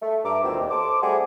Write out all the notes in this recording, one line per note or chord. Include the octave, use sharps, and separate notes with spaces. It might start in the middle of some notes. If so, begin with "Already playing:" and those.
A3
G2 E5 A#5 D6
D2 A#2 D#3 B3 C4
D#2
A4 C5 D6
G3 A3 C4 F#4 G#4